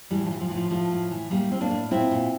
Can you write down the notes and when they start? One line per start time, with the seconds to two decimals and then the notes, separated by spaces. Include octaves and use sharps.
0.10 A2 E3 G3
0.26 F3
0.31 E3
0.40 F3
0.48 E3
0.51 A2 F3
0.71 A2 F3 A3
0.91 A2
1.11 E3
1.31 A2 G3 A#3
1.51 A2 C4
1.61 A#3 D4
1.71 A2
1.91 A#2 C4 E4
2.11 A#2